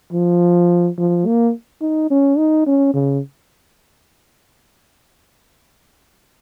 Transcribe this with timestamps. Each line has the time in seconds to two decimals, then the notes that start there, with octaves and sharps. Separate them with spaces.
0.13 F3
0.98 F3
1.26 A#3
1.81 D#4
2.10 C#4
2.37 D#4
2.67 C#4
2.94 C#3